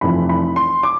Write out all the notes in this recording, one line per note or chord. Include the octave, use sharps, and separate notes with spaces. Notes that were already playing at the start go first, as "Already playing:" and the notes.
F1 F2 E3 B5
B5
C6
D6